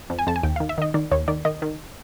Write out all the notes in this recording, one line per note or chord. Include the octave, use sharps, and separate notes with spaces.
F2
G#5
F2 A5
G#5
D#2 G5
F5
D#3
E5
D#3 D#5
D#3 D5
D#2 C#5
D#3 D5
D#3 D#5
D#3